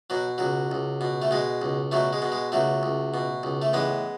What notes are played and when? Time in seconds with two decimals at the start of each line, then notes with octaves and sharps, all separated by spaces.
0.10 B2 F#3
0.38 C#2 F#3
0.71 C#2
1.01 B2
1.22 A3
1.31 B2 G#3
1.62 C#2
1.92 B2 F#3 A3
2.13 G#3
2.22 B2
2.32 G#3
2.52 C#2 F#3 A3
2.83 C#2
3.14 B2
3.43 C#2
3.62 A3
3.73 A1 G#3 B3